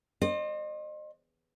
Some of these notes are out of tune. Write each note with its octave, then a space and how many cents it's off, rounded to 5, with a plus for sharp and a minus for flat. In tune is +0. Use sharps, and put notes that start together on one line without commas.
C5 +30 D#5 -35